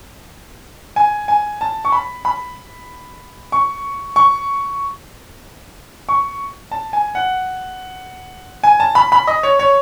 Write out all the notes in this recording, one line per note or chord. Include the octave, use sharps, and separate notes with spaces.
G#5
G#5
A5
C#6
B5
B5
C#6
C#6
C#6
A5
G#5
F#5
G#5
A5
B5
B5
D#5
C#5
C#5